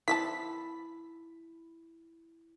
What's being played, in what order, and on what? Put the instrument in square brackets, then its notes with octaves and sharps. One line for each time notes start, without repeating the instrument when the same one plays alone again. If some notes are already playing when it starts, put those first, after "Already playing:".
[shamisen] E3 C4 A5 [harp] E4 B5 [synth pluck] B6